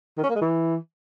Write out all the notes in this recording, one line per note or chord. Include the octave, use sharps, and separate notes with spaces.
D#3
C#4
A#3
G#3
E3